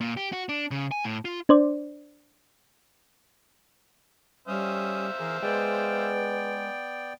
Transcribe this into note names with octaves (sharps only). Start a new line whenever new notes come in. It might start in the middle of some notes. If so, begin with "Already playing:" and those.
A#2
G4
F#4
D4
C#3
G#5
A2
F4
D4 C5 D5
G3 C#4 C5 E5 F5 D#6
E3 G#4 A#4
G#3 B3 B4 D5 G5